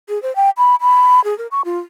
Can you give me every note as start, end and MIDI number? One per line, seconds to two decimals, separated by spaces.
0.09 0.21 68
0.22 0.34 72
0.36 0.50 79
0.58 0.75 83
0.81 1.23 83
1.24 1.36 68
1.38 1.47 70
1.51 1.62 85
1.65 1.78 65